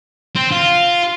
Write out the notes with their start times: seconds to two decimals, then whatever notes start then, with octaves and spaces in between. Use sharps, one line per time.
0.36 C4
0.52 F4